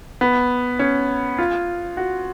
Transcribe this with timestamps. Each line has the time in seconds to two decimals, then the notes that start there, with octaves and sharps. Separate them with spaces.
0.21 B3
0.79 C#4
1.38 F4
1.97 F#4